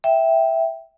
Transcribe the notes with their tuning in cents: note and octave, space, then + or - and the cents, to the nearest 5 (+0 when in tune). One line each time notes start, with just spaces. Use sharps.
E5 +0 G5 +0